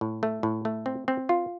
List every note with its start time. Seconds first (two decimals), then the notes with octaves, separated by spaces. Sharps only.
0.01 A2
0.23 A3
0.43 A2
0.65 A3
0.86 C4
1.08 C4
1.29 F4